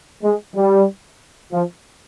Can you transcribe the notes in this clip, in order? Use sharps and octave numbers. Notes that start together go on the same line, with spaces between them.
G#3
G3
F3